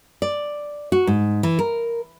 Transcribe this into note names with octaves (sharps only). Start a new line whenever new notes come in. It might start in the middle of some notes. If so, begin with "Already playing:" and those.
D5
F#4
G#2
E3
A#4